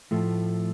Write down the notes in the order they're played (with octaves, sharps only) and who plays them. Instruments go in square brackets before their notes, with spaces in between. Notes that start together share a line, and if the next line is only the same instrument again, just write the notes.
[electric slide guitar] A2 F3 A3